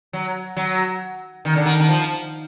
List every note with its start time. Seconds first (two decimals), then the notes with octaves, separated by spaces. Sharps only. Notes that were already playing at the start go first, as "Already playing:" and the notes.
0.13 F#3
0.57 F#3
1.45 D#3
1.56 D3
1.66 D#3
1.80 D#3
1.89 F3